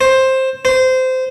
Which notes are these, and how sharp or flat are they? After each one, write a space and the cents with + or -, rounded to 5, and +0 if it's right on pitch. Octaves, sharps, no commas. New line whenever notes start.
C5 +10
C5 -20